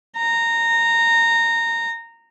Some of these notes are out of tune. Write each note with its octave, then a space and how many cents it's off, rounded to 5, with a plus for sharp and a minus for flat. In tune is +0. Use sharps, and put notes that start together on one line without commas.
A#5 -15